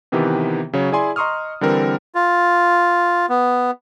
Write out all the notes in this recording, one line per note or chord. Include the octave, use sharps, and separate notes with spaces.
C3 D#3 E3 B3 G4 B4
C#3 F#3 C#5
E4 G#4 D5 G#5 C6
D#5 A#5 C6 C#6 D#6 F6
D3 E3 G3 C4 A#4
F4
B3